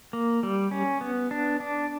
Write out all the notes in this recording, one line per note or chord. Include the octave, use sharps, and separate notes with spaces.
A#3
G3
C#4
B3
D4
D4